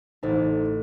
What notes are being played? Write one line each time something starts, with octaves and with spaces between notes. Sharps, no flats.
A1 D#4 A4 C5